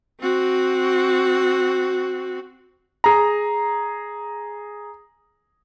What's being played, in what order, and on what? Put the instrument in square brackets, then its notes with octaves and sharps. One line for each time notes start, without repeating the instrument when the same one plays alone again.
[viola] C4 F#4
[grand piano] G#4 A#5